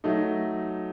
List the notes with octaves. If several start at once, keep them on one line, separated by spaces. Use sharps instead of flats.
F#3 A3 D#4